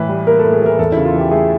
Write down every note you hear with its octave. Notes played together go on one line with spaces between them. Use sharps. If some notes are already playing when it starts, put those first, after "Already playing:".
Already playing: A2 E3 B4
G3
A#3 A#4
A4
A2
G#4
E3 A#4
E2 A4
C#3 E4
F4
E3 G4
A3 G#4